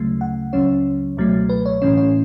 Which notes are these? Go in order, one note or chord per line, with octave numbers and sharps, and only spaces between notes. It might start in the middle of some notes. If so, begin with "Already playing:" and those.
Already playing: D2 C#3 F#3 A3
F#5
C#2 C#3 F#3 C#4 C#5
C#2 B2 F#3 A3
B4
C#5
A2 E3 A3 C#4 C#5
C#5